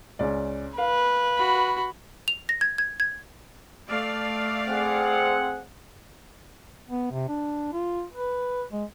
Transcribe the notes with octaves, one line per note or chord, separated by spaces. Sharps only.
C#2 C#4 D5
B4 F5
F#4 B5
F7
A#6
G#6
G#6
G#6
A3 D5 F5
C4 G#4 F#5
B3
C3
D4
F4
B4
G#3